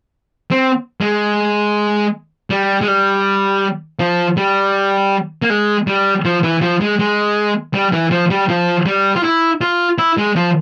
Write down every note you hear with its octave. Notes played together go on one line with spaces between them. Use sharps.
C4
G#3
G3
G#3
G3
F3
G3
A#3
G#3
G3
F3
E3
F3
G#3
G#3
G3
E3
F3
G3
F3
G3
F4
E4
F4
E4
G#3
F3